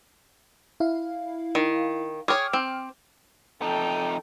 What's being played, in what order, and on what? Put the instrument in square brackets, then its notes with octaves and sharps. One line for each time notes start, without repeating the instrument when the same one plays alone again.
[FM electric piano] E4 F5
[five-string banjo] D#3
[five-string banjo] G#4 C#5 [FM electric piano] G5 D6 F6
[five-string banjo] C4
[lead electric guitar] F2 D#4 [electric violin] A4 G5